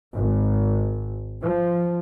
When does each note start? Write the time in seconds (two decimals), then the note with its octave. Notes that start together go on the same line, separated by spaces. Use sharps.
0.15 G#1
1.42 F3